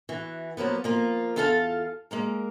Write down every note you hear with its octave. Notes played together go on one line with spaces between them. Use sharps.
E3 F#4
F3 F#3 A#3 B3
F3 A#3 F4
E2 E4 F4 A4 F5 A5
G#3 A#3 A#4